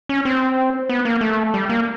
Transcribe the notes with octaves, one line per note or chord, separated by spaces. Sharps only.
C#4
C4
B3
A#3
A3
G3
A#3